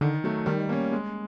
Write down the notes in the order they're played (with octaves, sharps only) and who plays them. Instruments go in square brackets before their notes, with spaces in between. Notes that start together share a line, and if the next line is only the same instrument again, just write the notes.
[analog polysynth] D3 [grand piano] D#3
[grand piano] F#3 A3
[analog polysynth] D#3 [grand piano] G3
[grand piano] A#3 C#4
G#3